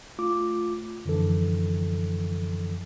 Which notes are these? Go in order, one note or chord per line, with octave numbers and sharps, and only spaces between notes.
A3 F4 D6
F#2 D3 E3 F3 A4